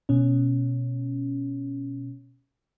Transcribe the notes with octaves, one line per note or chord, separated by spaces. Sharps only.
B2 C#4